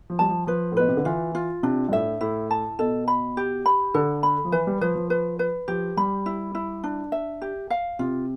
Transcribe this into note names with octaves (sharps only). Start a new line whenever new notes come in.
F3
G3 A5
F3
F3 B4
A2
B2 B4
C3
D3
E3 F4
F4
C3 D4
G2
A2 E5
A2 E4
A5
B2 A4
B5
G4
B5
D3 A4
B5
F3
E3 B4
G3
F3 B4
F3
B4
B4
F3 G4
G3 B5
E4
E4
D4
E5
G4
F5
C3 F4